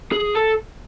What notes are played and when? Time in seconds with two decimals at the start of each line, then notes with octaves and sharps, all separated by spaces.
0.12 G#4
0.35 A4